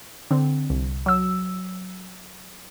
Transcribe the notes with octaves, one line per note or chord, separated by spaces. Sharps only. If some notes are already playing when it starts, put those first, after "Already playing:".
D3 C4
C2
F#3 E6